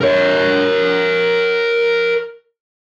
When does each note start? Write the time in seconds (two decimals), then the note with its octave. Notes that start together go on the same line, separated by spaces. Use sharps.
0.01 A#4 C#5